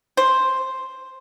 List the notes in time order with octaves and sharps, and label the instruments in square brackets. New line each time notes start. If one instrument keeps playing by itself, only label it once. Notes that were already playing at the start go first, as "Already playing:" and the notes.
[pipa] C5